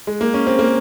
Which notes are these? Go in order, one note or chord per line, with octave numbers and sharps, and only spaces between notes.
G#3
A#3
C#4
C4
A#3